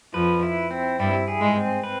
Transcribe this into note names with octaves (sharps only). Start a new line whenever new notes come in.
F2 F3 B4
E4
C4
G2 G3 E4
G#4
G#2 G#3
C4
B4